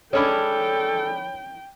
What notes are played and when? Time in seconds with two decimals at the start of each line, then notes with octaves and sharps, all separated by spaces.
0.13 G#3 C#4 D4 A4 C#5 G5 B5